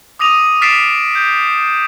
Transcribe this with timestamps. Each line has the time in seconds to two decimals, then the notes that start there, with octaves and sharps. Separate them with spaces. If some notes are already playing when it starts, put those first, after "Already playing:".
0.19 D6 D#6 A#6 D#7 F7
0.62 F6 A6 B6 C7 D7 E7
1.15 G6